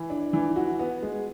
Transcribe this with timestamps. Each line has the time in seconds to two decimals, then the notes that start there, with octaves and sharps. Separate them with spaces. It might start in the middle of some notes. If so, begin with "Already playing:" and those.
Already playing: E3
0.10 D4
0.33 E3
0.56 F#4
0.79 B3
1.02 G#3